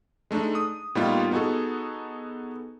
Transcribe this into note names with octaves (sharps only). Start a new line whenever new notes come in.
G#3 A3 D4 D#4
D#6
A2 G3 A#3 B3 D#4 F4
B3 D#4 F#4 G#4 A4